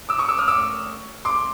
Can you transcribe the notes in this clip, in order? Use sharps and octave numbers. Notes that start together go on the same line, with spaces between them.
D6 E6
C#6 D#6
D6 E6
D#6 F6
D6 E6
C6 D6